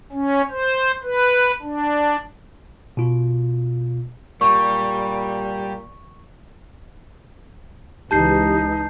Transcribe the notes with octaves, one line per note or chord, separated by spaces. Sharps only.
C#4
C5
B4
D4
B2 F4
A#2 G3 C#6
C#2 E3 D#4 G4 A5 G6 C7